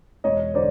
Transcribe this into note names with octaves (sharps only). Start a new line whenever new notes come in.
E1 C#5 D#5
D3 C5 D5